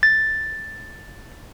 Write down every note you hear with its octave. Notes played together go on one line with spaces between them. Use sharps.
A6